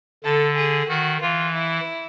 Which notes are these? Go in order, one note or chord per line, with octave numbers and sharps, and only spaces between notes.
D3 A4
G#4
D#3 F#4
E3 F4
E4